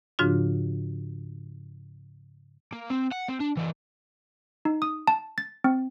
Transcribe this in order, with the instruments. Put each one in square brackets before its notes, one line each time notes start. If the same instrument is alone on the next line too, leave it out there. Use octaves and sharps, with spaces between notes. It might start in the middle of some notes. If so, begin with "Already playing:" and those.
[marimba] G#2 C#3 F3 D4 F4 F#4
[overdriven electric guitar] A#3
C4
F#5
C4
D4
E3 D4
[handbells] D#4
D#6
A5
A6
C4